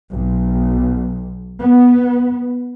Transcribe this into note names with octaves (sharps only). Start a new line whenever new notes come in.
B1
B3